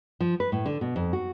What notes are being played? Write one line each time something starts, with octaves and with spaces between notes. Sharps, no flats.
F3
B4
A2
D3
B2
F2
F#4